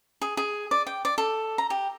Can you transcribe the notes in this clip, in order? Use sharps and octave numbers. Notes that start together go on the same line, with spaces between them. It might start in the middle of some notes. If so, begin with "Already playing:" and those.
G#4
G#4
D5
G5
D5
A4
A#5
G4